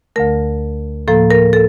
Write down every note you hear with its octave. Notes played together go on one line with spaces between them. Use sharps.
D2 D3 A3 A#4
A2 F3 A#3 A4
A#4
A4